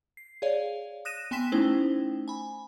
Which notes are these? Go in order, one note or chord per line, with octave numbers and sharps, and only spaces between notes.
C7
G#4 C#5 D5 F5
D#6 F#6 A#6 D#7 E7
B3 G5 G#5 C6 B6 E7
A3 C#4 D#4 E4 C5 G5
G#5 B5